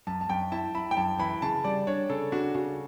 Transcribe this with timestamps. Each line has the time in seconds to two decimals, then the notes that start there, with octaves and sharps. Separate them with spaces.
0.07 F#2 A5
0.21 A5
0.29 F#2 G5
0.52 E4 A5
0.75 E4 B5
0.91 G5
0.97 F#2 A5
1.19 E3 B5
1.42 C#3 A5
1.64 G3 D5
1.87 D4 C#5
2.10 C#3 A4
2.32 D4 F#4
2.54 C#3 F#4